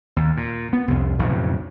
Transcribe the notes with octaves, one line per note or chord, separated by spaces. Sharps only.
D#2
A#2
B3
C2 F2
B1 F2 A2 C#3